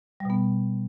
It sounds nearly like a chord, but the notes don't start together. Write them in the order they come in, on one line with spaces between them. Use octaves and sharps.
G3 B2 B3